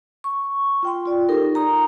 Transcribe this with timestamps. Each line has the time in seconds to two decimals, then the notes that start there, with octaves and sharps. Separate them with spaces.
0.24 C#6
0.83 F4 G5 C6
1.06 F4 D5
1.29 D#4 G4 A4 A#4
1.55 A#5 D#6